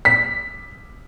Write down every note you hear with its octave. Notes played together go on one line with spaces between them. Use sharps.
B6